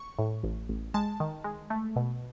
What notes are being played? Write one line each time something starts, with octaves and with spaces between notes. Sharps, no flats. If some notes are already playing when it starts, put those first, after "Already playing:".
Already playing: C#6
A2
A1
A1
G#3 A5
D#3
G#3
A3
B2